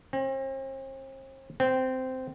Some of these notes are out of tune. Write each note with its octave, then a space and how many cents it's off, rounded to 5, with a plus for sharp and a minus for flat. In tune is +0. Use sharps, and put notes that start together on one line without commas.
C4 +40
C4 -15